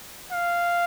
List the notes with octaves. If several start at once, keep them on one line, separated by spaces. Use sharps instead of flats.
F5